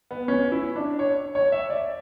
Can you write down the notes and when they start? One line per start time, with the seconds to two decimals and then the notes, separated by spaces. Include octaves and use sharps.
0.11 B3
0.28 C#4
0.52 E4
0.76 D4
0.99 C#5
1.35 C#5
1.52 E5
1.70 D5